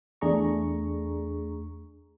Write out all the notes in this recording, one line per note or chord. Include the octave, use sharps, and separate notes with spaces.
E2 A3 D4 G#4 A#5 C#6